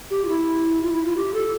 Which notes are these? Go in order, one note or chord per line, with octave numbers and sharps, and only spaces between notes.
G4
F4
E4
F4
E4
F4
G4
A4